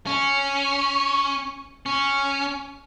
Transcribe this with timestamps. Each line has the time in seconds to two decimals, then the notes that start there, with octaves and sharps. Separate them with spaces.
0.07 C#4
1.86 C#4